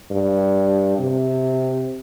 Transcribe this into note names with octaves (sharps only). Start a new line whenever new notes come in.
G2
C3